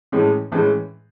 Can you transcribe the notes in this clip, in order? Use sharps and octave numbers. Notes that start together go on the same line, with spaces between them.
A2 E3 G#3 C#4
A2 E3 G#3 C#4